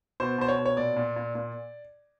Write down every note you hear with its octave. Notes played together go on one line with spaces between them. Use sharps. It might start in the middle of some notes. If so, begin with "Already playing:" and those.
B2 C5
B2 C5
C#5
B2
C#5
A#2 D5
A#2
A#2
A#2